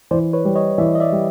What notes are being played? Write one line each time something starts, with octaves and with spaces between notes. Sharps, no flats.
E3 C5 D5
B4 C#5
G3
C#5 D#5
E3 D5 E5
D#5
D5 E5
G3